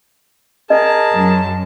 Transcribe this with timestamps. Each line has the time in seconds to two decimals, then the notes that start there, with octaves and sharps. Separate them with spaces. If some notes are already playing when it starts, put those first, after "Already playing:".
0.70 G#4 A#4 D#5 A5
1.14 F#2